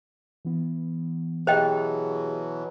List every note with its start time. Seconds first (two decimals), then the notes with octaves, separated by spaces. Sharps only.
0.45 E3 B3
1.47 B2 E3 F#3 G4 G#4 C5 D#5 G5